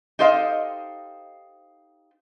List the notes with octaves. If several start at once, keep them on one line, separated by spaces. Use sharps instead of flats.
D#4 G4 A4 C5 D#5 F5